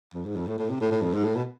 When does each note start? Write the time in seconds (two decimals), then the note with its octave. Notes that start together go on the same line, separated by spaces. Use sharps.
0.14 F2
0.26 G#2
0.36 F2
0.47 A2
0.59 A2
0.70 C3
0.81 A2
0.91 A2
1.02 F2
1.14 G#2
1.24 A2
1.36 B2